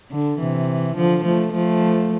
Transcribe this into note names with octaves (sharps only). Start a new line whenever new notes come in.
D3
C3 E3
D3 F3
F3 A3
F3 A3